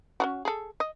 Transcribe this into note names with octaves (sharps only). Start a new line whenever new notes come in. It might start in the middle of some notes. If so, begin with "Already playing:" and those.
C#4 F4 F#4
G#4 A4
D#5